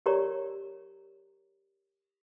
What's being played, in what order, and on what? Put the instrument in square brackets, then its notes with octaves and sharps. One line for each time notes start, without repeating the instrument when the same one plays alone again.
[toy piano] G4 A#4 C#5 D5 A#5 C#6